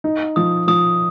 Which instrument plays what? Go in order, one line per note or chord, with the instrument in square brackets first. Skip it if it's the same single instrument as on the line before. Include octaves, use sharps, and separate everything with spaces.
[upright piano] D#4
[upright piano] F3 [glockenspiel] D#6
[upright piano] F3 [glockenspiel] D#6